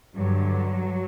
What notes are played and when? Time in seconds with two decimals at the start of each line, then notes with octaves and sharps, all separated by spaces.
0.13 G2 D3 F#3